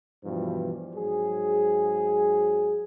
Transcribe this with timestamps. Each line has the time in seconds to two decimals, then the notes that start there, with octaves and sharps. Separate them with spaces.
0.24 G2 B2 E3 F3
0.95 G#2 F#3 G#4